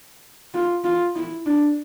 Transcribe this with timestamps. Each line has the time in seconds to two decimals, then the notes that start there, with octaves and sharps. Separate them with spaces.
0.54 F4
0.84 F4
1.16 E4
1.46 D4